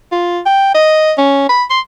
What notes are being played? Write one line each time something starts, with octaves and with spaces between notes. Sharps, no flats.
F4
G5
D#5
C#4
B5
C6